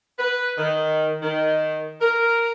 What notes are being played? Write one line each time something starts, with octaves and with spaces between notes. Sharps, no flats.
B4
D#3
D#3
A#4